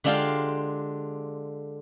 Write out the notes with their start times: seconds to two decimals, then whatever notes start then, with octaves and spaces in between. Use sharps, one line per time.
0.04 D3 G#3 D4 F4 G4 F5